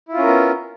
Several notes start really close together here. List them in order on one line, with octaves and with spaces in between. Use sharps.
E4 F4 C#4 A#4 B3